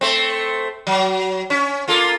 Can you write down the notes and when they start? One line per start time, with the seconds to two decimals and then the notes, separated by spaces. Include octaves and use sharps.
0.01 A3 C4
0.87 F#3
1.50 C#4
1.88 A#3 F4 A4